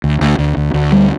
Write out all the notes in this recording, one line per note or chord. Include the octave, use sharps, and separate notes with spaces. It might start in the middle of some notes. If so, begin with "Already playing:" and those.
D2
D2
D2
D2
D2
G3